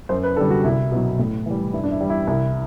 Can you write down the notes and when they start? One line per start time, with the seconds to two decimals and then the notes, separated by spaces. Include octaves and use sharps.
0.09 F#2 C5
0.23 B4
0.36 D3 G3 A4
0.50 F#4
0.64 C2 E4
0.92 B2 F#3
1.19 A2
1.46 E3 G3
1.73 G2 E4
1.84 D4
1.91 E4
2.01 E3 G3
2.10 E4
2.27 C2 E4